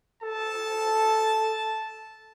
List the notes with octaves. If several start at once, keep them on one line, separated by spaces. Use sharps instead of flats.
A4 A5